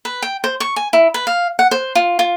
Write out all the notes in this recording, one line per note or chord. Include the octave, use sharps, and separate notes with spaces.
B4
G5
C5
C#6
G#5
E4
B4
F5
F#5
C5
F4
F4